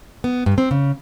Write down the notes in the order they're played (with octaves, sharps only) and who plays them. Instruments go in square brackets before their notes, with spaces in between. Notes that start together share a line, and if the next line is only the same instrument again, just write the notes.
[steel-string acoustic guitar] B3
G2
C4
C#3